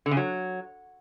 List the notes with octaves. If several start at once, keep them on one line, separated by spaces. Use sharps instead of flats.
D3
C#3
F#3